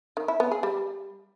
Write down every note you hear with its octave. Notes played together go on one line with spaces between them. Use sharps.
D#3
E4
B3
G#4
G3